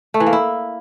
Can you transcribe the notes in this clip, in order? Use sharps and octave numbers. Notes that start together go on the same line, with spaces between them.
A3
E3
A#3
E4